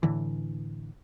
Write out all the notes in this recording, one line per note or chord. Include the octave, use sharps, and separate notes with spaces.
A2 D3 E3